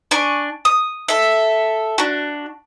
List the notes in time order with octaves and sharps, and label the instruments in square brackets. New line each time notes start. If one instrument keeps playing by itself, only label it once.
[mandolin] D4 G#5 C#6 D6
D#6
A4 E5
D4 F#4